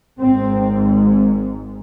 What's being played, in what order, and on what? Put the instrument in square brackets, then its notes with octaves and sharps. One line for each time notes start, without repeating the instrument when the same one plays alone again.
[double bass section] G#1 G#2 C4